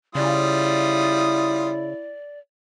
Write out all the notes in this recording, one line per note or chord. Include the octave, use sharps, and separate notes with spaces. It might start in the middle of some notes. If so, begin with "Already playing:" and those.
C#3 G3 E4 F4 D5 D#6